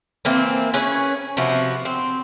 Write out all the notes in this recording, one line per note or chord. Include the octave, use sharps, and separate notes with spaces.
E3 A#3 C4
C#4 G#4 B4 C#5
C3 F3 B3 F#4
C4